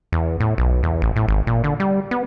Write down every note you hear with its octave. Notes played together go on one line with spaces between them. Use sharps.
E2
A2
B1
E2
A1
A2
G#1
A#2
D3
G3
B3